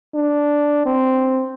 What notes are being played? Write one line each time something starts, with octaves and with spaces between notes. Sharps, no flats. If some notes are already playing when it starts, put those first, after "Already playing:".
D4
C4